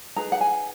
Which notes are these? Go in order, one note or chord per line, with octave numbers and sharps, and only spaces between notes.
D#4 G#4 B4 A#5
F#5
G#5